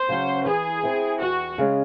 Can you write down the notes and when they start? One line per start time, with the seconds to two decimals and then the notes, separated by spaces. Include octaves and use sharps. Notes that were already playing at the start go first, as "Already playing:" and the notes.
Already playing: C5
0.09 C#3 F#3 C#4 F#4
0.46 E3 G#4
0.83 C4 E4
1.21 E2 F#4
1.58 C#3 G#3 C#4